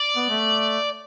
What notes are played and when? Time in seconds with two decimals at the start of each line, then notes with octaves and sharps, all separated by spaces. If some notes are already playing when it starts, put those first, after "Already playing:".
Already playing: D5
0.16 B3
0.30 A3